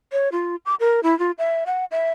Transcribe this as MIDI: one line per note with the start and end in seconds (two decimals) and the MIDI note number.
0.12 0.29 73
0.32 0.56 65
0.66 0.75 86
0.80 1.00 70
1.03 1.17 64
1.19 1.31 65
1.38 1.64 76
1.66 1.85 78
1.91 2.12 76